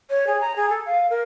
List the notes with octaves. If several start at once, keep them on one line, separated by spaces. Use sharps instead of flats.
C#5
G#4
A#5
G#4
A4
F5
A#4